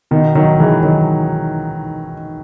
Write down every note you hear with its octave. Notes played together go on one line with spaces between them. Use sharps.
B2 D#3
D#3 F#3
E3 G#3
D#3 F#3